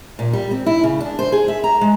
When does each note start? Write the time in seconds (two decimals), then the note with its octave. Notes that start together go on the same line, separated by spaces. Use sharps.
0.19 A#2
0.33 G3
0.51 C4
0.66 E4
0.84 C#3
1.00 D4
1.19 C5
1.32 G#4
1.48 E5
1.64 A#5
1.81 G#3